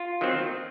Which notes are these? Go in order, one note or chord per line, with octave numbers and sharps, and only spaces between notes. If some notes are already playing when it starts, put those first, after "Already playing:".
Already playing: F4
D#3 F#3 C4